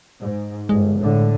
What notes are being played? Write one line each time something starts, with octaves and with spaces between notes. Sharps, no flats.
G#2
G1 G#3
A2 D3